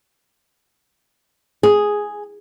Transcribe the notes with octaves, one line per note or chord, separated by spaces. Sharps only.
G#4